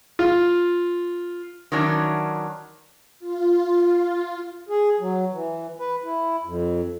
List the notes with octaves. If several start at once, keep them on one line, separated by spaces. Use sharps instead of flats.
F4
D#3 E3 F#3 C#4 D4
F4
G#4
F#3
E3
B4
E4
F2